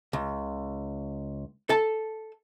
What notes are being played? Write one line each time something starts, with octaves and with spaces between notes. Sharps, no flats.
C#2
A4 A5